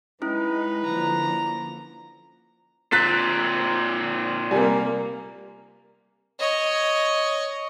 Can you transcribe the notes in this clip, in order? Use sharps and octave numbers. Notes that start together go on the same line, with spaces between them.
G#3 C#4 D#4 E4 B4
D3 F3 A#3 A#5
A#2 C4 F#6 A6 B6
C3 G3 A#3 G#5
C#5 D#5